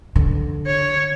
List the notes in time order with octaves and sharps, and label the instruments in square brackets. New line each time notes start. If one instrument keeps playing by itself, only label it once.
[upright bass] D3
[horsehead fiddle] C#5